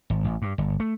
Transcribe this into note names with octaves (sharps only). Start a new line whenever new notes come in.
G#1
A1
G2
G1
A3